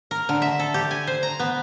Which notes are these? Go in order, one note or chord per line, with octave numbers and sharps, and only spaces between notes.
A#4
D3
E5
A4
G4
G#5
C5
A#5
B3